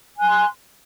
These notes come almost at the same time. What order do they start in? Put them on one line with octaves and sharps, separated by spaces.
G#5 F#6 C6